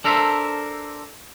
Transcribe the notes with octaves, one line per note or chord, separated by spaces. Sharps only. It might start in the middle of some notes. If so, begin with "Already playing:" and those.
D4 A4 A#4 C5 E5